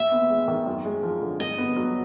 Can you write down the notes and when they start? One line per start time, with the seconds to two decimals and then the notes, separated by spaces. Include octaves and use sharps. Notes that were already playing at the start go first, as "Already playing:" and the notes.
Already playing: D#2 E5
0.12 B3
0.30 G#3
0.48 D#3
0.66 F#2
0.85 G#3
1.03 F3
1.22 D3
1.40 G2 D#5
1.58 B3
1.76 F#3